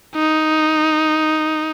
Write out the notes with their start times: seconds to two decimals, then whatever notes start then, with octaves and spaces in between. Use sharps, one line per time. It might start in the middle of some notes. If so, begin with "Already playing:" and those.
0.15 D#4